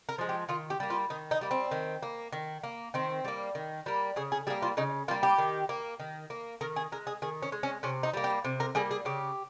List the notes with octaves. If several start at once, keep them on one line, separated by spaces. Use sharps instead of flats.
A#4
F3 G#3
G4
D#3 F4
G4
G3 A#3
F4
D#3 D#4
D#4
G3 A#3
C4
D#3
A#3
D#3
A#3
D#3 C4
G3 A#3
D#3
G3 A#3
C#3 G#4
G#4
G3 A#3 G#4
F4
C#3 D#4
G3 A#3 F4
G4
D#3
A#3
D#3
A#3
D#3 A#4
G#4
G#3 A#4
G#4
D#3 G#4
C#4
G#3
C#4
C3 C#4
D#4
G3 A#3
G4
C3
A#4
G3 A#3 G#4
G#4
C#3 G4